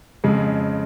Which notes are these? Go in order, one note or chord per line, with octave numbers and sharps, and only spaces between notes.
F2 C#3 G#3